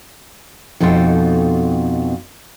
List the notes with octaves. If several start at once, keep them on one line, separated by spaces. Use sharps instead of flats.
F2 B2 D#4 A4 C5 G5